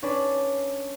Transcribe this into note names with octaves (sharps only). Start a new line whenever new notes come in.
C#4 D4 B4